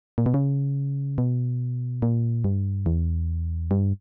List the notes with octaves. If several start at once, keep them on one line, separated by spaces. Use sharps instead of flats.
A#2
B2
C#3
B2
A#2
G2
E2
G2